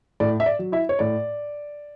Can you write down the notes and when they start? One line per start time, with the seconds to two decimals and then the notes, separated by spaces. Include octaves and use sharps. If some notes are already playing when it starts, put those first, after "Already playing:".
0.20 A2 D5
0.40 E5
0.46 D5
0.59 F#3
0.72 E4 E5
0.89 C#5
0.99 A2 D5